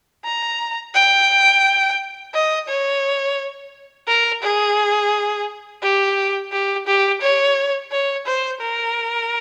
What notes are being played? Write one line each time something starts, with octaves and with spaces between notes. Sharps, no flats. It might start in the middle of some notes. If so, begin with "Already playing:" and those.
A#5
G5
D#5
C#5
A#4
G#4
G4
G4
G4
C#5
C#5
C5
A#4